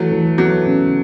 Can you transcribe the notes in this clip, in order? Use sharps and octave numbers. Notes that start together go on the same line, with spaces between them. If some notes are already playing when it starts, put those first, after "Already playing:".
Already playing: E3 F#3 A3
E3
F#3 B3
C#3